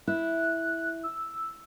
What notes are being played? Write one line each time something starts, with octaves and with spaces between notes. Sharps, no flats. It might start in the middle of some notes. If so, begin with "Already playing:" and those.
E4 F#6
E6